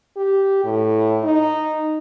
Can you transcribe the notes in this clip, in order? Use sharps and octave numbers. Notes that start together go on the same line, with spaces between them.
G4
A2
D#4